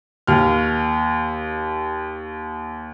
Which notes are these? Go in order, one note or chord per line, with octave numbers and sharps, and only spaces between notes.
D#2 F6